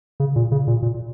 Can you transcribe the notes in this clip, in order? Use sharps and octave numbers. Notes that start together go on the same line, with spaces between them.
C#3
A#2
C#3
A#2
A#2